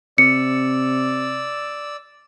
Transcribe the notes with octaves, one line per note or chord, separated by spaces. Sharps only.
C3 D5 E6 C#7